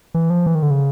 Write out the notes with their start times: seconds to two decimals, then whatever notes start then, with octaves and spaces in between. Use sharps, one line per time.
0.14 E3
0.30 F3
0.46 E3
0.55 D#3
0.63 D3
0.71 C#3